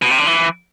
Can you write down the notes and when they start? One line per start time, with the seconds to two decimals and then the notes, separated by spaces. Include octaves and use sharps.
0.02 B2
0.10 C3
0.18 D3
0.26 E3